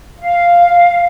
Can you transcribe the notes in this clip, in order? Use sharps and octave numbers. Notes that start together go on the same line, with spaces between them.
F5